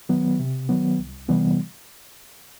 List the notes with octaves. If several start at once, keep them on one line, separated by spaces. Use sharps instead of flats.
D#3 F#3 B3
C3
D#3 F#3 B3
C2
C3 E3 G3 B3